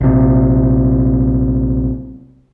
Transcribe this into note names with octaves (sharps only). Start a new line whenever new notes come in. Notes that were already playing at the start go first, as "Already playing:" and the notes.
A#1 C3